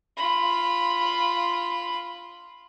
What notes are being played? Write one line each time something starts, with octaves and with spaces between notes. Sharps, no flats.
F4 B5